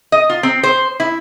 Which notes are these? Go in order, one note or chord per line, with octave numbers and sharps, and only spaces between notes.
D#5
F4
C4
C5
E4